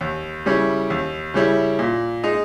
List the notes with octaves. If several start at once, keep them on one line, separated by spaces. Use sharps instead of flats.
D#2
C#3 G3 C#4 E4
D#2
C#3 G3 C#4 E4
A#2
G#3 D#4